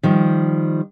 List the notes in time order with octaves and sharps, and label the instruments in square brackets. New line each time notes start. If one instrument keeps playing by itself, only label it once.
[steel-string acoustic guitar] D#3 F3 G3